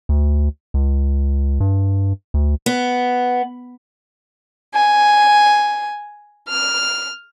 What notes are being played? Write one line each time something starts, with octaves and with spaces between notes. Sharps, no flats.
D2
C#2
G2
D2
B3
G#5
F6